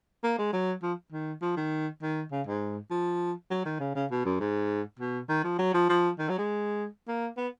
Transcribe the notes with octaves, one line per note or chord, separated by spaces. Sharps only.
A#3
G#3
F#3
F3
D#3
F3
D#3
D#3
C#3
G#2
F3
F#3
D#3
C#3
C#3
B2
F#2
G#2
B2
D#3
F3
F#3
F3
F3
D#3
F#3
G#3
A#3
B3